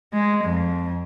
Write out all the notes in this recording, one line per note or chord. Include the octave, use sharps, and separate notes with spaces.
G#3
F2